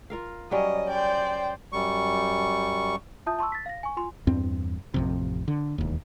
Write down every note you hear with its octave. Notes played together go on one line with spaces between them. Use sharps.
F4 A#4 F5
F#3 G3 C#4 D#5
C5 D5 G5
F#2 G3 C#6
E4 F4 E5 A5 D#6 G6
A5 C6 C#6 E6
A6 B6
F5 A#6
G#5 C#6
F4 G#5 C6
E2 G2 C4
A1 F2 C3
D3
E1 D#2